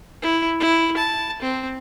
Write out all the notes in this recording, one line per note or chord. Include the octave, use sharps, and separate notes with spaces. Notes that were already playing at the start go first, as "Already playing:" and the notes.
E4
E4
A5
C4